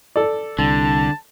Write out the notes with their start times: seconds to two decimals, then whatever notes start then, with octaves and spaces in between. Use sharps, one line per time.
0.16 A4 D5
0.59 C2 D3 A5